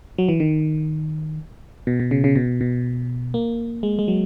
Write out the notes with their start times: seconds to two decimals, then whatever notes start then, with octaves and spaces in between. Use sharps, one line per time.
0.18 F#3
0.29 E3
0.40 D#3
1.87 B2
2.00 B2
2.11 C#3
2.24 C#3
2.36 B2
2.61 B2
3.34 A#3
3.83 G#3
3.99 G#3
4.08 F#3